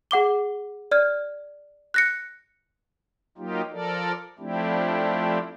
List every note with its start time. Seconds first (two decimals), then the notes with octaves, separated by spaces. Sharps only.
0.11 G#4 F#5 D6 G7
0.91 D5 F6 G#6
1.94 F#6 A#6 C#7
3.38 F#3 A#3 D#4 F4 G4
3.71 F3 A4 A#4 D5
4.39 F3 A3 C4 D4 E4 G4